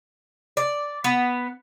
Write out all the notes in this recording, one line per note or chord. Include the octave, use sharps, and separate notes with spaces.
D5
B3